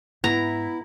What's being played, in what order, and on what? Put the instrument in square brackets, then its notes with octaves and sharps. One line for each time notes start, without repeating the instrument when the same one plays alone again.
[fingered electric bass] G#2 [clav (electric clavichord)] B3 [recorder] E4 [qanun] A#5